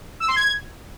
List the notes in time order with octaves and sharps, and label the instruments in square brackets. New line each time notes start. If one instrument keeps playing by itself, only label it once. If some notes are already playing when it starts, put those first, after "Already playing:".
[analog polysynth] E6
C6
G#6